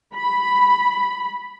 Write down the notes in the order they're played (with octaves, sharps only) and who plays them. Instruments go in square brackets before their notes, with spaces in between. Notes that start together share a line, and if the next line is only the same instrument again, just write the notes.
[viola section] B5